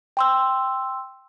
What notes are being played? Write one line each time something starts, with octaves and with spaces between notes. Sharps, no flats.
G5 C6 E6